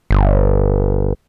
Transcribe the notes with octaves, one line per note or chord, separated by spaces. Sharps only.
G1